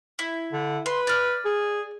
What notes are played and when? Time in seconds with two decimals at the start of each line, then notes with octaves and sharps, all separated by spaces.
0.19 E4
0.52 D3
0.86 B4 C6
1.07 D5 F6
1.45 G#4